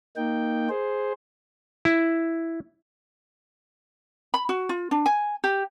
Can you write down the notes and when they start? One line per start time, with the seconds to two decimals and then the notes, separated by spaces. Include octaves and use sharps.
0.16 A#3 D#4 G5
0.69 G#4 C5
1.85 E4
4.34 B5
4.49 F#4
4.69 F4
4.91 D4
5.06 G#5
5.44 G4